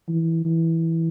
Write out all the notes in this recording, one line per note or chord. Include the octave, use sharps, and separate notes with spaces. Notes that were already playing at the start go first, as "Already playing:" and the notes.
E3
E3